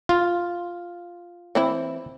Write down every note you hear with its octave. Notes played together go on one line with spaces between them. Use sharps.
F4
E3 C4 E4